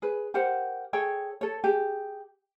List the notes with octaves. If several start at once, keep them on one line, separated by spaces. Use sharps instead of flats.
G#4 B4
G4 A#4 C5 F#5
G#4 A4 C#5 G5
A4 C#5
G4 G#4